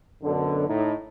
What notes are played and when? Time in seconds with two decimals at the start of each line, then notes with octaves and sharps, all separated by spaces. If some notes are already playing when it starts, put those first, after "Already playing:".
0.23 F#2 B2 D3
0.67 A2 D#4